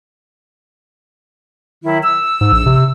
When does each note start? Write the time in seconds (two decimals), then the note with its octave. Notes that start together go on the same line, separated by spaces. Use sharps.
1.83 D#3 F#3 E4
2.03 E6
2.41 G#2
2.52 A#1
2.66 C3